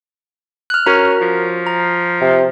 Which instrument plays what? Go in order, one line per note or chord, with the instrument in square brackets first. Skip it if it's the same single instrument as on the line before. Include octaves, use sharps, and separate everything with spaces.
[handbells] F6 F#6
[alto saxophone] C#4 [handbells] F#4 A#4 A#5
[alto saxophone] F3
[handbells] A#5
[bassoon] C3